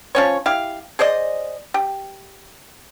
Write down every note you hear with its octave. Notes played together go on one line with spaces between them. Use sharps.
F3 C#4 C#5
E4 G4 F5
G#4 C5 D5 D#5
G4